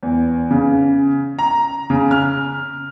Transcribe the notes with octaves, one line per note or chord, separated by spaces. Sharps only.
E2
C#3
A#5
C#3
F6